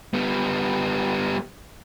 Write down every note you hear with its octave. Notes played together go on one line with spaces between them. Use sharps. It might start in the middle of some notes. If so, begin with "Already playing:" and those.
G3 B3